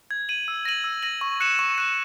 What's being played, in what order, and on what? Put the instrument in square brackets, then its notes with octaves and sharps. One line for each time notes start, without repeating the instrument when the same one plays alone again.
[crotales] G#6
D#7 F#7
E6
A#6 D#7 F#7
E6
A#6 D#7 F#7
C#6
F#6 C#7 E7
C#6
F#6 C#7 E7